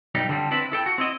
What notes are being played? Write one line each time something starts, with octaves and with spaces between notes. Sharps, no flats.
B1 G3 D#4
D3 F3 G3 C4
C4 D4 E4 B4
E4 A4 G5
F#4
C4 E4 D#5